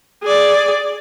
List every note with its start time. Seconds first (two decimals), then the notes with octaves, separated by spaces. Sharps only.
0.23 G#4 D5